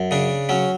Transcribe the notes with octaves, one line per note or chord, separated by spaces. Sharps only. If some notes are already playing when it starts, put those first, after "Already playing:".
Already playing: F#2
C#3 D4
F#3 C#4